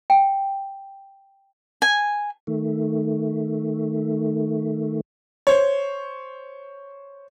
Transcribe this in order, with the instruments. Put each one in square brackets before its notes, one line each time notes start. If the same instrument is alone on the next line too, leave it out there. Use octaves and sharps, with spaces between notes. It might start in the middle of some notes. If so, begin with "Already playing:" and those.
[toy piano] G5
[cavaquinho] G#5
[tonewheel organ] D#3 A3
[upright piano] C5 C#5